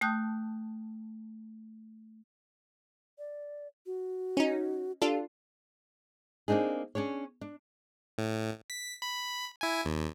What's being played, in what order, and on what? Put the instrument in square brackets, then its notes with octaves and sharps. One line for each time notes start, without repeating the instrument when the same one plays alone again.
[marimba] A3 G5 A5 D#6 F#6 G6
[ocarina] D5
F#4
[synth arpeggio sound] C#4 D#4
[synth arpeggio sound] D4 F4 A4 [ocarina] G4
[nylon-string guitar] A#3 C4 D4 D#4 G#4
C#4 D4 G#4 C#5
D4
[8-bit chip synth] A2
B6
B5
E4 G#5
D#2